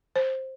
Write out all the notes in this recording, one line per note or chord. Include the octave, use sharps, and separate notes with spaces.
C5